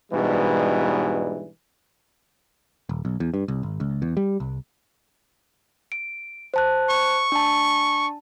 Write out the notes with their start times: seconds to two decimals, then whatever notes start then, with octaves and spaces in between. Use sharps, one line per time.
0.12 G#2 B2 E3 G3 D4
2.89 D#1
3.05 B1
3.20 E2
3.34 G2
3.48 C2
3.63 G#1
3.80 C#2
4.02 E2
4.17 G3
4.40 C2
5.92 D7
6.54 C5 A5 F#6
6.90 C#6
7.32 D4 A5